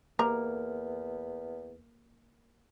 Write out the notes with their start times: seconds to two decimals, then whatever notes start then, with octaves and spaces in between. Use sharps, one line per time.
0.19 E2 A#3 G4 A#5